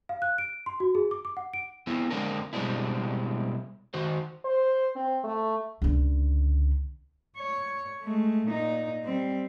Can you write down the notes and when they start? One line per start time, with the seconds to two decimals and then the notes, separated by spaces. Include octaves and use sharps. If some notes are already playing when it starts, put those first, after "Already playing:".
0.09 F5
0.22 F#6
0.38 D7
0.66 C6
0.80 F#4
0.95 G#4
1.11 D6
1.25 D6
1.37 F#5
1.54 D7
1.87 B3 C4 E4
2.11 D3 G#3 A#3 C4 D4 A#4
2.53 B2 G3 G#3 C4 D4 E4
3.94 D#3 F#4 C5
4.45 C5
4.96 C4
5.24 A3
5.82 C#2 D3
7.38 C#5
8.03 G#3 A3
8.47 A#2 D#4
9.04 G3 C4